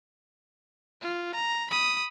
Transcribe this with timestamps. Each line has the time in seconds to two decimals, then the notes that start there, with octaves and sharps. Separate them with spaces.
1.01 F4
1.35 A#5
1.71 B5 D#6